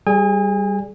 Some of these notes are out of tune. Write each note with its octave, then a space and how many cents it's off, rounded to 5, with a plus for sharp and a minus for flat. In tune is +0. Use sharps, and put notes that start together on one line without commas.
G3 +0 G#4 +20 G#5 -35